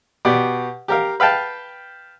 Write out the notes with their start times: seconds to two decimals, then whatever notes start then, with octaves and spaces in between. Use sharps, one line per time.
0.25 B2 G4 D5
0.88 G4 A#4 F5
1.20 B4 F5 G5 A5